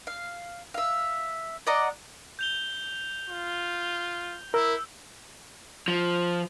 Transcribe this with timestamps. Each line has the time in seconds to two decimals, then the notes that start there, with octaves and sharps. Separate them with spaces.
0.07 F5
0.74 E5 F5
1.67 D5 D#5 F#5 A#5
2.39 G6 F7 G7
3.29 F4
4.54 E4 A#4 E6
5.88 F3